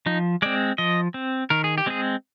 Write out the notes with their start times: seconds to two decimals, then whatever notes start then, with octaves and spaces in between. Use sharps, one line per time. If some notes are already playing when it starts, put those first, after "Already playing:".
0.06 F3 D#4
0.42 G#3 C4 D5
0.78 F3 D#5
1.14 C4
1.50 D#3 A#4
1.64 G#4
1.78 G4
1.86 G#3 C4 G#4